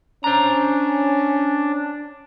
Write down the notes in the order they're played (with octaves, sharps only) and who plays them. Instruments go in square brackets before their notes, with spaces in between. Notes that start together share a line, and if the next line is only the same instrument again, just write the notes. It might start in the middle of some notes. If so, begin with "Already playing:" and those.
[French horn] C#4 [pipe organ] D4 [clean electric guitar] C5 A#5